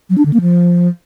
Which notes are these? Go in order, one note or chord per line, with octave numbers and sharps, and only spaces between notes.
F#3
D4
D3
A#3
F3